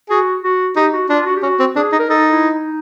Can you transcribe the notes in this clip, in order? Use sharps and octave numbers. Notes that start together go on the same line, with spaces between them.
F#4 G#4
F#4
D#4 G4
F#4
D4 F4
F#4
G4
C#4 F#4
C4
D4 G#4
D#4
A#4
D#4 A4
E4
D#4